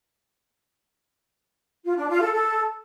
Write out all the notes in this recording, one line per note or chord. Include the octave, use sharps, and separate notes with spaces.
F4
D4
F4
A4
A4